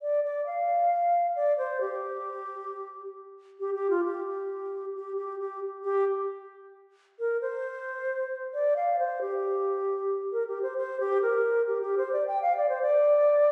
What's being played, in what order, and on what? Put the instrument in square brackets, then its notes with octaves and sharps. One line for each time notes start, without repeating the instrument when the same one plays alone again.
[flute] D5
D5
F5
D5
C5
G4
G4
G4
F4
G4
G4
G4
G4
G4
A#4
C5
D5
F5
C5
G4
A#4
G4
C5
C5
G4
A#4
G4
G4
C5
D5
G5
F5
D5
C5
D5